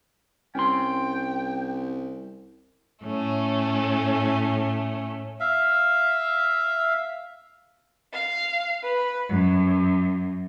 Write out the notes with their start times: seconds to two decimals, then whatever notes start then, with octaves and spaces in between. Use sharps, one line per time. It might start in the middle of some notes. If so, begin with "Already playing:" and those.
0.55 C2 C#4 G5 C6
3.02 A2 A3 C#4
5.40 E5 F5
8.14 F5
8.82 B4
9.29 F#2